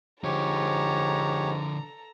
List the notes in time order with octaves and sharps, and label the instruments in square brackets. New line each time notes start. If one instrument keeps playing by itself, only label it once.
[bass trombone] G#2 [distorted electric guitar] D3 F3 [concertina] G4 C#5 [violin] A4 A#5